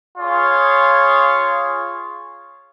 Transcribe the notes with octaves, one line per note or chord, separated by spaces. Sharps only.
F4 G#4 C#5